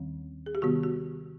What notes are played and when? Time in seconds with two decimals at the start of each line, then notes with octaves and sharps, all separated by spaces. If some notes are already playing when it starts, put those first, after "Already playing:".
Already playing: D#2 D#3 G3 C4
0.46 G#4
0.55 G4
0.62 C3 D#3 G3 B3 F#4
0.83 F#4